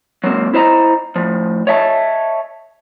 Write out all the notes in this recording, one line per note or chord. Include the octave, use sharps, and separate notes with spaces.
F#3 G#3 A#3 C4
E4 C5 D#5 A#5
A2 F3
C#5 D#5 E5 A5